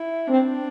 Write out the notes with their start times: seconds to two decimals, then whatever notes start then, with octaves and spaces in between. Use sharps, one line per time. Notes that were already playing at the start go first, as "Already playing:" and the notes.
Already playing: E4
0.27 C4 D4